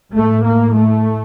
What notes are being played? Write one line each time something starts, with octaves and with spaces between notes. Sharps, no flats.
A2 A3
A#3
A3